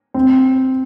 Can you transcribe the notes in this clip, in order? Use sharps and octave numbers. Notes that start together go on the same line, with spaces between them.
C4